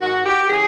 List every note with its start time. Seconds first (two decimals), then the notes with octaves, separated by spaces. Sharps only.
0.01 G#2 D#3 F#4
0.26 G4
0.50 C#3 E3 G#4